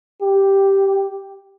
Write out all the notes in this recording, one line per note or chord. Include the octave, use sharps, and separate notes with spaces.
G4